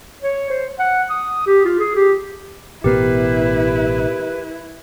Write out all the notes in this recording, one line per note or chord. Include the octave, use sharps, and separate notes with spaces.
C#5
C5
F#5
D#6
G4
F4
G#4
G4
A1 B2 B3 E4 G4 A#4 B4 C7